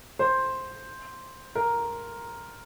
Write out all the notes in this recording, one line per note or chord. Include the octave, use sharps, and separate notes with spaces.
C5
A#4